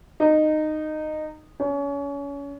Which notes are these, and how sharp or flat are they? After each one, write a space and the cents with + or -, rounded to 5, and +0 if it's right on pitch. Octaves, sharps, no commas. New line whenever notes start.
D#4 -15
C#4 +30